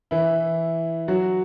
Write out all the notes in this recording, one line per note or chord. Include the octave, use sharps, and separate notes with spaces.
E3 E4
F#3 F#4